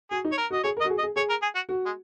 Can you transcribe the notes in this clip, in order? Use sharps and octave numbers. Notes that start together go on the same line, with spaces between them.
F#4 G#4
D#4
C#5
A#4
F#4 D#5
G#4 C#5
A#4
D#5
F#4
G#4
D#5
G#4
G#4 C#5
A#4
G#4
F#4
F#4
G#3